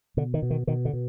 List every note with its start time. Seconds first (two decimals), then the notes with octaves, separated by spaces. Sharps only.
0.17 B2 D3
0.34 D#3
0.42 B2
0.50 D#3
0.67 B2 D#3
0.85 D3
0.93 B2